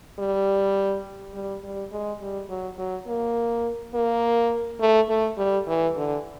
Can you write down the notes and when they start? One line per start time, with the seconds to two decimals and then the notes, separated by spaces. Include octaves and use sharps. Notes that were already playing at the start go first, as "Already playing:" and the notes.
0.19 G3
1.34 G3
1.63 G3
1.92 G#3
2.21 G3
2.49 F#3
2.78 F#3
3.07 A#3
3.94 A#3
4.80 A3
5.09 A3
5.38 G3
5.68 E3
5.96 D3